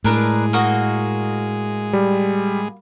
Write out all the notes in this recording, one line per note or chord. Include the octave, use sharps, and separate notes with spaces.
A2 G#3 D4 A#4 B4
A#3 F#4 D#5
G3